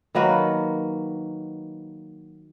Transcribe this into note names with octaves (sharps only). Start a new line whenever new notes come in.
D#3 F#3 A#3 B4